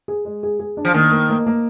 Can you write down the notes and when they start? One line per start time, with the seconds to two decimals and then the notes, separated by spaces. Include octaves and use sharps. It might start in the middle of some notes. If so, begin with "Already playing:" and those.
0.08 G#4
0.25 G#3
0.43 G#4
0.59 G#4
0.77 D4
0.85 F3
0.94 D#3 A#3
1.12 A#3
1.30 A#3
1.46 A#3